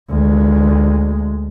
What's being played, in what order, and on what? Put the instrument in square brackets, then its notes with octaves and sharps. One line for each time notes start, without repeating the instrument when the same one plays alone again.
[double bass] D2 G#3